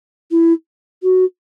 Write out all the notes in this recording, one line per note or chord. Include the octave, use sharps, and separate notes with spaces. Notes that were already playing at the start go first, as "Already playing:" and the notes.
E4
F#4